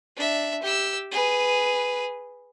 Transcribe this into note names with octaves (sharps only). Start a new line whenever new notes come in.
D4 E5
G4 E6
G#4 B4